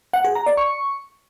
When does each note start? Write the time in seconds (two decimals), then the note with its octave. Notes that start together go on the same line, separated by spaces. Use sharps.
0.13 F#5
0.24 G#4
0.35 A#5
0.46 D5
0.57 C#6